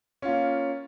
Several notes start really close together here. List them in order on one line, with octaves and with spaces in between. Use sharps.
C#4 F4 A#3